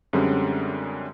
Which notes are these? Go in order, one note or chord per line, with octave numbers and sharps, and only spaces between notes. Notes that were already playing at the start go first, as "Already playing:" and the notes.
F#2 D3 G3 G#3 C4 C#4